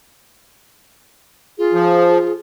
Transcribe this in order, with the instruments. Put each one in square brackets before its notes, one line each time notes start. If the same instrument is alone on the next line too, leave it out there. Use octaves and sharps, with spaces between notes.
[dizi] F4 [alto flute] G#4
[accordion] F3